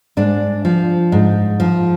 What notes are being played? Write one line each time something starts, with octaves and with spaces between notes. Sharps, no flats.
G#2 D4
F3
G#2
F3